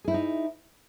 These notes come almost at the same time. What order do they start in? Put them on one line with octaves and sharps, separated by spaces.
G#4 E4 C5 D#4